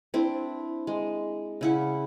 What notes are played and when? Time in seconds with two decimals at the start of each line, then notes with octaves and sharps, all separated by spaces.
0.14 C4 D4 E4
0.87 G#3
1.61 C#3 E4 F#5